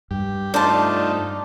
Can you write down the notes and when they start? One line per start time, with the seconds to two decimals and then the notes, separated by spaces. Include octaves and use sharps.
0.11 G2 G4
0.54 A3 D4 D#4 F4 C5 A5